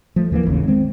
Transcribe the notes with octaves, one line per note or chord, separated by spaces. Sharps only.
F3 A3
D#2 E3 A3 A#3
G#1 D#2 C#3
D#3 G#3 C4